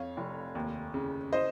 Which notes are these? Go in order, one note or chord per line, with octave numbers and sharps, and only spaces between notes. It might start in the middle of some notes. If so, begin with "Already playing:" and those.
Already playing: F2 C#5 F5
F1
D#2
C#3
C5 D#5